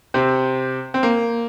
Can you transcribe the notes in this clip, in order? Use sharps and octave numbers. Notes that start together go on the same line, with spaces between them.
C3 C4
C4
A#3